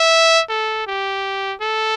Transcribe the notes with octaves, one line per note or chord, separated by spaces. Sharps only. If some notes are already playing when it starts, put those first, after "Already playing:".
Already playing: E5
A4
G4
A4